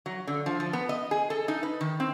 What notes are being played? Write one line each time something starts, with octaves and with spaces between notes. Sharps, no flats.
F#3
D3
F3
F3
B3
D#5
G#4
A4
D#4
B4
D#3
C4